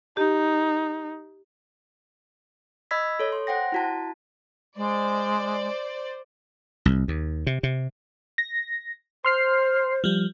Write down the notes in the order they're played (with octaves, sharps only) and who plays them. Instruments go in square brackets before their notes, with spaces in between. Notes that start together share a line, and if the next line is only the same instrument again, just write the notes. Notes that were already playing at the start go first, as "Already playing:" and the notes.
[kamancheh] D#4 [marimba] G4
[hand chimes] D#5 B5 E6 G#6 B6
A4 C#5
C6
C5 F#5 G5 A#6
E4 F#4 A5
[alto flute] G#3 [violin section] C5 D5
[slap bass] C2
D#2
C3
C3
[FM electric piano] A#6
[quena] C5 [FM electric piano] C6 F6 C7
[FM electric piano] F3 G3